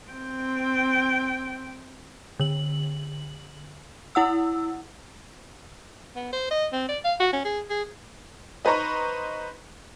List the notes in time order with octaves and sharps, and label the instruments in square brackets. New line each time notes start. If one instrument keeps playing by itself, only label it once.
[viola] C4 G5
[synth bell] D3 F#7
E4 F#5 E6
[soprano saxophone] B3
C5
D#5
C4
D5
F5
F#4
C#4
G#4
G#4
[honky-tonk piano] D#4 B4 C5 A#5 C#6